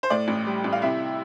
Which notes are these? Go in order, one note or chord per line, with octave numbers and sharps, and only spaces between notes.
C5
A2 D5
A1
G3
A1
F5
C3 E4 E5